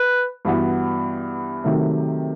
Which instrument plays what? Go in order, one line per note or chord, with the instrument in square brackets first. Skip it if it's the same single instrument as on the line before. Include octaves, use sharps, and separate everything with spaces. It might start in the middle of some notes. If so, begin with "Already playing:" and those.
Already playing: [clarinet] B4
[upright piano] G2 E3 B3 F#4
C3 D#3 F#3 A3